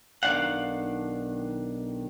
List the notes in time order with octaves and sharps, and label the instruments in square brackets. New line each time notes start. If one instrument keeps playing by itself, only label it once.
[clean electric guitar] B1 D#3 B3 D4 F5 F#5